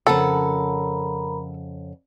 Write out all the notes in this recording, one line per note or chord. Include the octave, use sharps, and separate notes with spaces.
F2 C#3 A4 A#4 F#5 A#5 B5